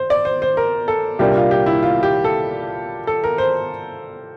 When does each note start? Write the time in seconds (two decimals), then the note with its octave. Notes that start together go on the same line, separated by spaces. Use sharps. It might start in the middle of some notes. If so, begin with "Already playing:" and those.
Already playing: C5
0.10 D5
0.25 C5
0.42 C5
0.57 A#4
0.88 A4
1.19 C2 A#2 G3 A#3 D4 G4
1.35 F4
1.51 G4
1.66 E4
1.83 F4
2.03 G4
2.24 A4
3.07 A4
3.24 A#4
3.38 C5